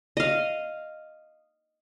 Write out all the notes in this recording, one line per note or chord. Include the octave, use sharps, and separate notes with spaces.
D#5 F5